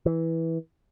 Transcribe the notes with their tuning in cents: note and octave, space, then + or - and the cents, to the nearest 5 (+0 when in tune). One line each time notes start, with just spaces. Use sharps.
E3 -10